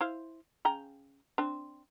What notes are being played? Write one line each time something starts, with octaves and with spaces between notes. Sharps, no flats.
E4 C5 F5
C#3 G5 A#5
C4 D4